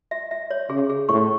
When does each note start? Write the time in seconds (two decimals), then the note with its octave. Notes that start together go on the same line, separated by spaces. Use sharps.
0.11 E5
0.31 E5
0.50 C#5
0.70 C#3 G#4
0.90 G#4
1.09 A2 C#6